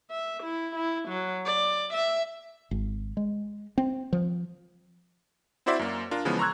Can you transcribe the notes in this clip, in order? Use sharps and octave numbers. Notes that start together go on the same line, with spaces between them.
E5
E4
E4
F#3
D5
E5
G#1
G#3
C4
F3
C4 E4 F#4 C5 D5 E5
F#2 A#3
D4 F4 A#4
C#3 E3 F3 G#3 B3
A#5 C6 C#6 E6 F#6 G#6